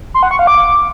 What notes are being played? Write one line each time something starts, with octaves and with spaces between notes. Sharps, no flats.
C6
F#5
C#6
F5
D6